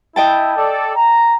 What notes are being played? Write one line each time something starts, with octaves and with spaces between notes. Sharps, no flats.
E4 D#5 G5 A5
A4 D5
A#5